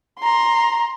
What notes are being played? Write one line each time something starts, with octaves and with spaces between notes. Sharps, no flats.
A#5 C6